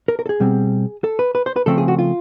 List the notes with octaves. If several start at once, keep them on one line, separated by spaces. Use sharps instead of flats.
A#4
A#4
A4
G#4
B2 G3 C4
A4
B4
B4
C5
B4
C#3 F3 A3 C4 A4
G#4
F#4
F4